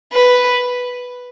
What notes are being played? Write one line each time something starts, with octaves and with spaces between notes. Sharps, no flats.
B4